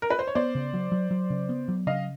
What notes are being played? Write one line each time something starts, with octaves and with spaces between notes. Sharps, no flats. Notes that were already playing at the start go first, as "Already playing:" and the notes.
A#4
B4
C5
C#5
B3 C5 D5
C#3
F#3
F#3
F#3
C#3
B3
F#3
C#3 D#5 F5